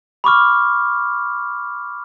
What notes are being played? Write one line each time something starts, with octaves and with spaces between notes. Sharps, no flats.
B5 C#6 D6 F6